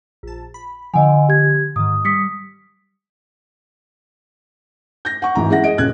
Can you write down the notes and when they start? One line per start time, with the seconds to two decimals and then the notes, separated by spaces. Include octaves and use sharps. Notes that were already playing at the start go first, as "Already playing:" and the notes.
0.23 A#1 A5
0.54 B5
0.94 D3 F3 D#5 F#5 G#5
1.29 G4 G#6
1.76 G#2 D#3 D#6
2.05 G3 D#6 B6 C#7
5.05 G6 A#6
5.22 F#5 C#6
5.35 G#1 E3 A#5
5.49 F#2 G#3 E4 E5 F#5 A#6
5.64 G#4 D#5 D7
5.78 D#1 C#3 F#6 G#6